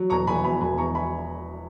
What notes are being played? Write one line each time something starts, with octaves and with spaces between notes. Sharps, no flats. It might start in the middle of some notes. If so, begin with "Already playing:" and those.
Already playing: F#3
E1 A#5 C#6
E1 G#5 B5
E2 G#5 B5
E1 G#5 B5
E2 A#5 C#6
G#5 B5